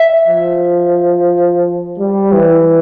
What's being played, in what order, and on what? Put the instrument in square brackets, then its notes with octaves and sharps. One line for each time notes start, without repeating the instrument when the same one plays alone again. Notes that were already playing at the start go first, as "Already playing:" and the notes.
Already playing: [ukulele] E5
[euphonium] F3
G3
E3